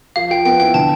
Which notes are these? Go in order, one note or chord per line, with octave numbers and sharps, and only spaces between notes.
F3 F5
F3 G5
B3 G5
E4 G5
D3 A5